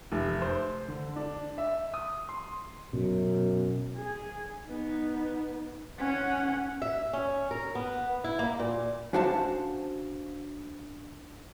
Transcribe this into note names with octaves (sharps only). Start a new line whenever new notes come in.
F1
C5
D3
D4
E5
D#6
C6
F#2 B2
G#4
B3 D#4
C#4 F#5
E5
C#4
A#4
B3
E4
A#3
A#2
C#4 D4 F#4 C5 F5 A5